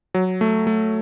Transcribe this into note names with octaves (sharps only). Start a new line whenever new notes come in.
F#3
A3
A3